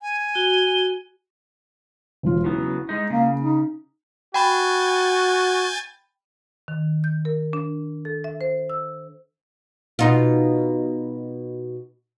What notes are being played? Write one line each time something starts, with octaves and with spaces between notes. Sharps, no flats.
G#5
F#4 G7
E1 F3 F4
C#3 F#3 B3 E4
G#3 D#4
C#3 A#3
D#4
F#4 G5 G#5 B5 G6 A6
D#3
G6
A#4
D4
A4
E5
C5
E6
B2 D#4 F4